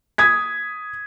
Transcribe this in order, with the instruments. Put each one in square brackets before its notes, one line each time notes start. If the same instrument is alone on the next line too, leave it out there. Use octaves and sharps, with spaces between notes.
[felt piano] D#6 G#6 B6